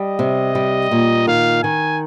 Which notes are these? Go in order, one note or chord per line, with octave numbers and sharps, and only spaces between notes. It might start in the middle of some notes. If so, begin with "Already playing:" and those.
Already playing: G3 D#5
C3
G3
A#2
D#3 F5
D#3 G#5